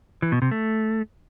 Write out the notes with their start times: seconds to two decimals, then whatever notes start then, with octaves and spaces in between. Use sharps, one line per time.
0.22 E3
0.32 B2
0.42 C3
0.51 A3